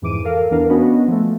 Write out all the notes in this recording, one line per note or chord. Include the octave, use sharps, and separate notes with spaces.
F2 G#2 E3 D6 D7 D#7
A4 A#4 F5
E2 E3 B3 D4 A#4 F5
B3 C#4 D4 F#4 B4 D#5
F3 A3